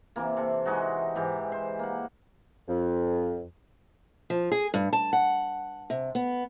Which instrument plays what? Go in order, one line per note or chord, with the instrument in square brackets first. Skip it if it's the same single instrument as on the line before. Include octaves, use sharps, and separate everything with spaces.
[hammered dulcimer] C3 E3 A#3
C3 A4
E3 G#3 D#4 F#4
G#2 E3 G4
C5
A#3 F#5
[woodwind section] F2
[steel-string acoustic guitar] F3
G#4
G2
A5
F#5
C3
B3